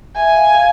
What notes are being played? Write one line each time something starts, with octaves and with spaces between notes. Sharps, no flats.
E5 G#5
F5
F5